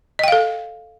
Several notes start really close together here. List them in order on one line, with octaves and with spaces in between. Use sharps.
D#5 G5 F5 A4